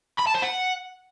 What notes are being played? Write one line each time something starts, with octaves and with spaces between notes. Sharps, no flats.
B5
A5
C5
F#5